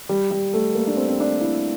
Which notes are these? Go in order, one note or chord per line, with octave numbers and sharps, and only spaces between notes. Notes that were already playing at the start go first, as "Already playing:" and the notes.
G3
G3
A3
A#3
D4
C4
C4
D4
E4